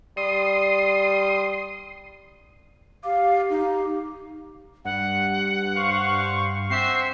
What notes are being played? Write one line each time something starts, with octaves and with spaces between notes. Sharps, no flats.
G3 C6 D#6
G4 F5
D#4
G2 F#5
C5 F5 C#6
C4 F#4 C5 E5 C7